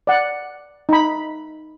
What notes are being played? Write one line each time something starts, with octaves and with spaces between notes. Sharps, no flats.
D5 F#5
D#4 B5